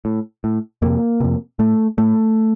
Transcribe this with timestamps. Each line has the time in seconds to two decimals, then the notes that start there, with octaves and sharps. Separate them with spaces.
0.05 A2
0.44 A2
0.82 F2 C3 A#3
1.20 F2 C3
1.59 A2 A3
1.98 A2 A3